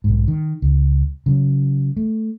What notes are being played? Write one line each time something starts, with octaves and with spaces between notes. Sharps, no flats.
B1 G#2
D#3
C#2
C#3 F#3
A3